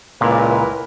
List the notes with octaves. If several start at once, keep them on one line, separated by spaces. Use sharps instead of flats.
C#2 A#2 E4 A#4 B4